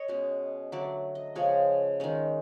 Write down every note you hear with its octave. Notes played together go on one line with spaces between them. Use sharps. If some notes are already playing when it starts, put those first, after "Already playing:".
Already playing: C#5 D#5
B2 G#3 C#4
D3 F#3 A3 D5
D#5
C#3 F3 G#3 C#4 C#5
D#3 G#3 C#4